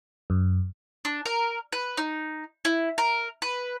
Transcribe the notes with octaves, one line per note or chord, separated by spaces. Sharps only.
F#2
D4
A#4
B4
D#4
E4
A#4
B4